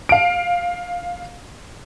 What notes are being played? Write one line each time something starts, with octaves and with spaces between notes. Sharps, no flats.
F5 D7